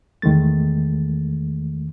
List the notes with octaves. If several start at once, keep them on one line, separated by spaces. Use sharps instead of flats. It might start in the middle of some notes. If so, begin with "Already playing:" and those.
E2 D#3 G#3 A3 A6